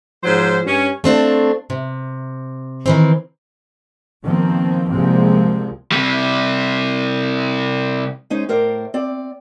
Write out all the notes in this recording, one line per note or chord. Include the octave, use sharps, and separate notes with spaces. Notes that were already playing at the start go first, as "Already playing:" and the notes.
G#2 F3 F#3 C5
G2 C#4
A3 C4 D4 F4
C3
D#3 E3 C4
B2 D#3 F3 A#3 C4
C2 C3 F3 G#3 A#3 C4
C3 G3
G#3 C#4 D#4 C5
A2 A#4 C5 D5
C4 D5